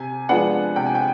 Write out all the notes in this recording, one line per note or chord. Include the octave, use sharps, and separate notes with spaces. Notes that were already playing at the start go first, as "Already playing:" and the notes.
Already playing: C3 G#5
F3 G#3 B3 D4 F#5
C3 G5
G#5
G5